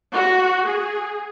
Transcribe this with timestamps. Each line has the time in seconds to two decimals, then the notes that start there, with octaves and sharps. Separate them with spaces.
0.12 F#4
0.66 G#4